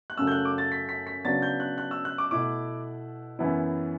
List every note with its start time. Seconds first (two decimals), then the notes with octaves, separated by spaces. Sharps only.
0.10 F#6
0.17 F#2 C#3 F#3 A3 E6
0.27 G6
0.32 F#6
0.45 D6
0.58 A6
0.72 B6
0.89 B6
1.07 B6
1.25 C#3 F#3 B3 D4 A6
1.42 G6
1.60 F#6
1.78 F#6
1.91 E6
2.05 F#6
2.18 D6
2.31 B2 A3 E4 D6
3.39 F#2 E3 B3 E4